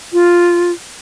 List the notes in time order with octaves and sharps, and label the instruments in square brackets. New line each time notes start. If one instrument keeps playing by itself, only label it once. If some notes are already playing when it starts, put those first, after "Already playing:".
[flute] F4